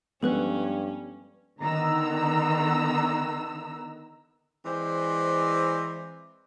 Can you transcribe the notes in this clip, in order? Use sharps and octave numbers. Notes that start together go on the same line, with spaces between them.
G2 F3 G#3 B3 C#4 A4 B4 F#6
D3 D#3 B3 A#5 E6
E3 G#3 C4 C5 D5